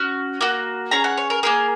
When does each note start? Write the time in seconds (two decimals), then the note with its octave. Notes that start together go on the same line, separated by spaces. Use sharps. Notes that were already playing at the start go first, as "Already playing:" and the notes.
Already playing: C#4 F#4 C#6
0.41 A#3 F#4
0.91 C#4 G#4 A#5
1.04 F#5
1.17 C#5
1.30 A#4
1.43 A#3 C#4 G#4 A#4